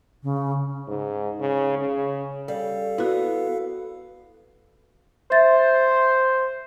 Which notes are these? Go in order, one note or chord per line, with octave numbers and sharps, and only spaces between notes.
C#3
G#2
C#3
C#3
G3 A4 F5
B3 E4 F#4
C5 E5 A6